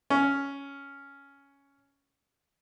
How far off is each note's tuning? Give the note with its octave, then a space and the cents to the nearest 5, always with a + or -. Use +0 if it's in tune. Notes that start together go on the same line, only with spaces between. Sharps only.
C#4 +5